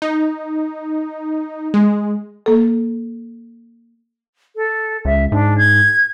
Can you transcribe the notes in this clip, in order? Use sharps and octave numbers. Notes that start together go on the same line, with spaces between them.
D#4
G#3
A#3 A4
A4
C#2 E5
G#2 D4
G#6